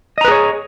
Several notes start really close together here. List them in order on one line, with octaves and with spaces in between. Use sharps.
D#5 A#5 B4 G#4 C#5